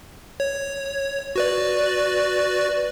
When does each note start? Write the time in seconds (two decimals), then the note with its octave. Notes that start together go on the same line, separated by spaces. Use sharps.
0.40 C#5
1.36 F#4 B4 D5